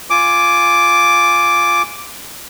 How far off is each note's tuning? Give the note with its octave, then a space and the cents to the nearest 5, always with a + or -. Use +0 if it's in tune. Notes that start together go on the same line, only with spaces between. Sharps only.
F4 +0 G#5 +0 D6 +0